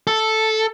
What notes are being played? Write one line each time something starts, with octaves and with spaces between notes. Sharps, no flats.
A4